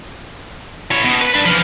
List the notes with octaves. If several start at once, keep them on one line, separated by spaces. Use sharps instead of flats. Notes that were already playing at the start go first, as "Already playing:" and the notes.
E3 C#5
B2
B4
D4 B4
E3 F3